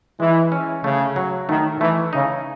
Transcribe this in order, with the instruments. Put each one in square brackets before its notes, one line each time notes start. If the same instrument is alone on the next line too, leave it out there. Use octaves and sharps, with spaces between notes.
[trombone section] E3 [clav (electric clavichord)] G#3
[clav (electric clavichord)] C#4
[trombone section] C#3 [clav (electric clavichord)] A3
[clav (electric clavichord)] F#3
[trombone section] D#3 [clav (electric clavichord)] A3
[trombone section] E3 [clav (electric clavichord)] A3
[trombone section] C#3 [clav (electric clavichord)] D#4